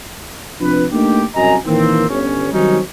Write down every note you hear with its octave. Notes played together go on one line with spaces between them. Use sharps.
C3 F3 D4 B4
A3 A#3 D4 D#4 G4
C2 F#2 D#5 G#5 A#5
A#2 D#3 E3 A#3 C4
G1 C#4
D#3 F#3 G3 C4 C#4 D#4